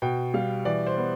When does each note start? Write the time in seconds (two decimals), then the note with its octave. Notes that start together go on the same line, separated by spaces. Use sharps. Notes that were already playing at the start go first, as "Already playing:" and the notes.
0.02 B2 G5
0.34 G3 F5
0.65 E3 D5
0.87 C5
0.97 B3